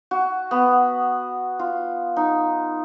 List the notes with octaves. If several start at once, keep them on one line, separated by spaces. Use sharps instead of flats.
F#4
B3
F4
D#4